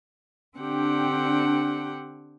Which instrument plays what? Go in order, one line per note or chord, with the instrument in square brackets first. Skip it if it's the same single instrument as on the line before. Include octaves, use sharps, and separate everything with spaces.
[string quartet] D3 C4 D4 G4 F#5 G5